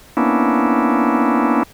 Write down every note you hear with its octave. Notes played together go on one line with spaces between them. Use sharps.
A#3 B3 C#4 D4 E4